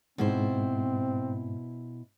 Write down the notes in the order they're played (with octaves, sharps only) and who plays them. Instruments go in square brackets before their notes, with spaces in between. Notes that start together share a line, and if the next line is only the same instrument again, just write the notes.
[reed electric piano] G#2 [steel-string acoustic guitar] B2 E4 C5 [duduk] C4